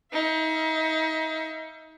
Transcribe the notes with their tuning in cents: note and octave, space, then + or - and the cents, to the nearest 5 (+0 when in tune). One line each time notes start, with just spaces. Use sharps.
D#4 +35 E5 +45